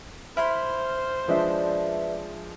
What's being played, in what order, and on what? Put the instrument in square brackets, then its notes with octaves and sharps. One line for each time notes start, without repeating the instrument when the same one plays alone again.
[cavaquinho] E4 B5 C6 [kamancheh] C5 [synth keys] F6
[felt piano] F3 G#3 D4 [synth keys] B4 D5 E5